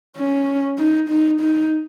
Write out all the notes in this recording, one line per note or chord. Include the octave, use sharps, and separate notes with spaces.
C#4
D#4
D#4
D#4